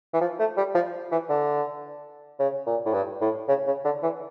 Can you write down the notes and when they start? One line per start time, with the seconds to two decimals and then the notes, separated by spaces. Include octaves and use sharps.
0.13 E3
0.21 F3
0.39 A3
0.57 G3
0.75 F3
1.12 E3
1.29 D3
2.40 C#3
2.67 A#2
2.85 A2
2.93 G2
3.21 A2
3.48 C#3
3.67 C#3
3.85 D3
4.03 E3